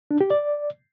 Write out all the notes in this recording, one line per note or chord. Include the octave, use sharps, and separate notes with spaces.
D4
G4
D5